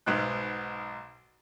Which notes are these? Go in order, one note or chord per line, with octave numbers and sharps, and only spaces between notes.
B1 G#2 B2 F#6